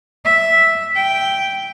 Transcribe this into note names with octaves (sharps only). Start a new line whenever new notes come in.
E5
G5